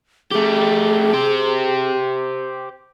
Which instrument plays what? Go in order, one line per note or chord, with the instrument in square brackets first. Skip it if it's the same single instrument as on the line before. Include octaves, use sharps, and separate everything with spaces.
[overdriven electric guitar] A3 G4 [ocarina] G#4
[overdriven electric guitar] G4 C5